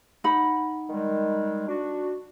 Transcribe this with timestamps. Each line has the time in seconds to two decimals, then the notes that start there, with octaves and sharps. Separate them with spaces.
0.24 D#4 F#5 B5
0.90 D#3 G3 G#3
1.68 D4 F#4